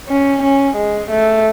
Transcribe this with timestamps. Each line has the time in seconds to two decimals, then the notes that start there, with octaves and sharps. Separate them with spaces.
0.08 C#4
0.43 C#4
0.76 G#3
1.11 A3